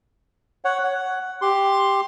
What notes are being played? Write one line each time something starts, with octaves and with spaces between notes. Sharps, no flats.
C#5 F#5
F#5
G4 C6